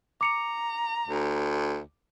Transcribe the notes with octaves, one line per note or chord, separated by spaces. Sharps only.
A#5 D6 C#7 F7
D2